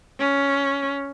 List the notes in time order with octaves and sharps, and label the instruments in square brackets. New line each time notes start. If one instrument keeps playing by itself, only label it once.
[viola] C#4